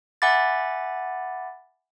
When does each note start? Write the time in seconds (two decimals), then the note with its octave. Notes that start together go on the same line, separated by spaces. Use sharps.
0.22 E5 F#5 G#5 B5 D6 A6